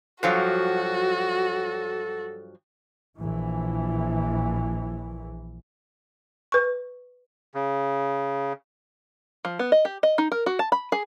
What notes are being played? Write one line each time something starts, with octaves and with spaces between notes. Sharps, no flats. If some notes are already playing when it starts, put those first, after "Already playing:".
G2 F3 F#3 F#4 A4
A#1 E3
B4 C#6
C#3
F3
B3
D#5
G4
D#5
D#4
A#4
F#4
A5
B5
G#4